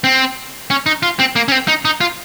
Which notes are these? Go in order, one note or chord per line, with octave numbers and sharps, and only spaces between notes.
C4
C#4
D#4
F4
C4
A#3
C#4
C4
D#4
D#4
F4